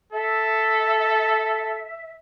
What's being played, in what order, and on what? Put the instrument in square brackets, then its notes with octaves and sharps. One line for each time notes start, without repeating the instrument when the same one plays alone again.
[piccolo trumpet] A4 [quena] E5